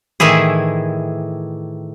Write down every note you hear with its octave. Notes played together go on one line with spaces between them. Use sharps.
A2 D#3 E3 E4 G#4